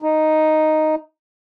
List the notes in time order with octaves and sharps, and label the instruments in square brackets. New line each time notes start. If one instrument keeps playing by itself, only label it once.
[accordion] D#4